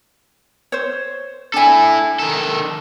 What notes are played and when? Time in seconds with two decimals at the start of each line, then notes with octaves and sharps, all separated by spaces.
0.72 C5 C#5
1.54 D4 E4 A4 G#5
2.19 D#3 A4